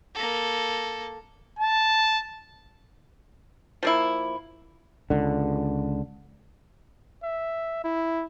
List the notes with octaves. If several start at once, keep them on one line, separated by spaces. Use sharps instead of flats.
A#3 A4
A5
F3 A#3 E4
C#2 D3
E5
E4